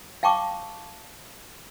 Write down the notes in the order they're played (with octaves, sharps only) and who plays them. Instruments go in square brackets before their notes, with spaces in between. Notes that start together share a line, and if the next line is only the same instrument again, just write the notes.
[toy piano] F5 G5 A5 C#6 D6